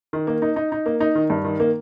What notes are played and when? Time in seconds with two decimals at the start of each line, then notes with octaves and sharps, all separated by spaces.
0.13 D#3
0.27 A#3
0.42 D#4
0.56 D#4
0.72 D#4
0.86 A#3
1.00 D#4
1.15 D#3
1.30 G2
1.44 D#3
1.60 A#3